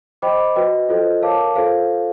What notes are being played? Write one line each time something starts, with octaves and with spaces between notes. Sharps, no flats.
C5 D#5 G5 B5 D6
F#4 B4 D#5 G5
F4 A4 C5 D#5
A#4 C#5 F5 A5 D6
F4 A4 C5 F5